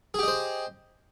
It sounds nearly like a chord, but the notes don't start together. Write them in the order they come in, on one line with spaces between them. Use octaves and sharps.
G#4 G4 D#5 C5